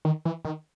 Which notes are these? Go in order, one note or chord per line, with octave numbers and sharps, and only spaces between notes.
D#3
E3
D#3